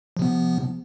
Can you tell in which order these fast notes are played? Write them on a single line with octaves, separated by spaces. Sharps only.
F3 C3 B3